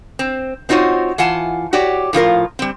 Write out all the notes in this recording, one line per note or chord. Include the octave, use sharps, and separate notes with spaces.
C4
C4 D#4 F4 F#4 C#5
E3 F4 F#5 G#5 A5
F#4 G4 C#5 D5
A2 F3 F4 A#4
G3 C4